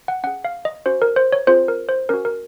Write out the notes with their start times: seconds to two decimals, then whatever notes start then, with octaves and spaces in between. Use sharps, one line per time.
0.08 F#5
0.24 C#4 G#4 F#5
0.45 F5
0.65 D#5
0.86 C#4 F#4 C5
1.02 A#4
1.16 C5
1.32 C#5
1.47 C4 F4 G#4 C5
1.68 A#4
1.89 C5
2.09 C#4 F#4 A#4
2.25 A#4